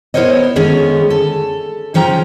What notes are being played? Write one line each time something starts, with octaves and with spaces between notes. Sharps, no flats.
B3 E4 A#4 C5 C#5 D#5
D3 D#3 G#3 B3 C#4
A4
C#3 F3 C#4 G5 A#5